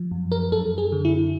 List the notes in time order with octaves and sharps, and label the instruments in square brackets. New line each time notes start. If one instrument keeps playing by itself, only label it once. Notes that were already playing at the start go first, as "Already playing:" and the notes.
Already playing: [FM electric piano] F3
F#2
A#4
F#2 A4
G#4
D3
E4